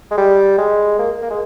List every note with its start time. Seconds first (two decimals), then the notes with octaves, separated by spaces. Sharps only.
0.11 G#3
0.18 G3
0.58 G#3
0.99 A#3
1.22 A#3
1.30 G#3